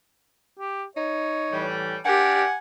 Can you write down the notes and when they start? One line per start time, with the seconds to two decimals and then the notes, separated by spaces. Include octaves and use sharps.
0.59 G4
0.97 D#4 C#5
1.52 A2 E3 G3
2.05 D4 G4 A#4 D5 F#5 G#5